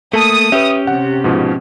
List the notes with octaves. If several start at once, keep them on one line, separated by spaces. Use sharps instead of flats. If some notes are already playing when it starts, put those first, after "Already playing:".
A3 A#3 A4 A5 D#6
C#4 G4 B4 E5
C3 F#5
G#2 B2 F3